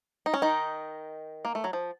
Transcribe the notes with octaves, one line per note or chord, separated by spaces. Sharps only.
D#4
C#4
D#3 D#4
A#3
A3
F#3
F3